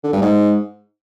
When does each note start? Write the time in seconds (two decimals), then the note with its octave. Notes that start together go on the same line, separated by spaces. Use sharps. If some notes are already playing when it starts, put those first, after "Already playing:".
0.04 D3
0.13 G2
0.22 G#2